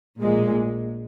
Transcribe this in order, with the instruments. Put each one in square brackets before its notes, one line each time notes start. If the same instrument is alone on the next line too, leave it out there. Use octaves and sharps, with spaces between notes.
[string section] A#1 A#2 G#3